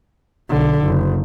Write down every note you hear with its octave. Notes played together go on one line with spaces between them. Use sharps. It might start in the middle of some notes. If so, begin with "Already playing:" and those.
B1 D3
F#1